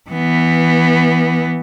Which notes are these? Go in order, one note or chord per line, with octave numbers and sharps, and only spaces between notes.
E3 B3